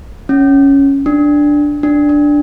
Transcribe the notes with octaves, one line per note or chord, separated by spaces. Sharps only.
C#4
D4
D4
D4